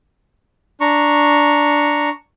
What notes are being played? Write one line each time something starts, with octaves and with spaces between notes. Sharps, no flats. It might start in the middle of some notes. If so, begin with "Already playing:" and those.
D4 A#5 C#6